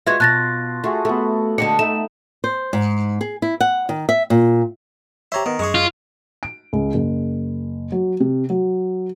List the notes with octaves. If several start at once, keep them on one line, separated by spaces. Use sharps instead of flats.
G#3 B3 F4 F#4 E5 C#6 G#6
B2 A5 F#6 A6 A#6
A3 F4 F#4 G#4
A3 B3 F#4 A4
D3 G#3 D4 D#5 F#5 G5 C#7
A3 D#4 E5 E7
C5
G#2
G#4
E4
F#5
D#3
E5
A#2
G4 C5 C#5 E5 A#5
D#3 B3
F#2 G#3 G#4 C#6
F4
D7
C#2
F#1
F#3
C3
F#3